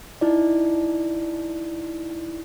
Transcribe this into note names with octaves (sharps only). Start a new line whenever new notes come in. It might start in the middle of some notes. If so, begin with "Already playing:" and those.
D#4 E4 D5